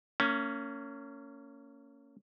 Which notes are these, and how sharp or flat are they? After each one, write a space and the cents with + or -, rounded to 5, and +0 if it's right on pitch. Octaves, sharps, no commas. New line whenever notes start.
A#3 -30 C#4 +10